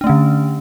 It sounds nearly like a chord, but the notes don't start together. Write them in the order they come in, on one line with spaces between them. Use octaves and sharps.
D4 A3 C#4 D3